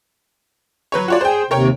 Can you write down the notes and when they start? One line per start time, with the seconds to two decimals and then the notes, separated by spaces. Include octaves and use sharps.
0.92 F#3 B4 C#5
1.08 F4 F#4 C#5 D5
1.21 G#4 C5 G5
1.51 D#2 C3 A#4 C#5 G5